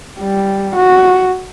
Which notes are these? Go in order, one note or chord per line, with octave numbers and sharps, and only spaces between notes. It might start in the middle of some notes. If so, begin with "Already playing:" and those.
G3
F#4